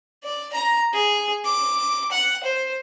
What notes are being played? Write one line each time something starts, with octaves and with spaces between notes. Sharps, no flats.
D5
A#5
G#4
D6
F#5
C5